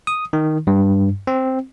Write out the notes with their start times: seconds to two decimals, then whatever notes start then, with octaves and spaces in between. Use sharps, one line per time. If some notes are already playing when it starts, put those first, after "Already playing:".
0.07 D#6
0.33 D#3
0.67 G2
1.27 C4